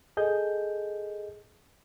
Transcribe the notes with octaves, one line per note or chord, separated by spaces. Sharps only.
G#4 A4 D#5 G6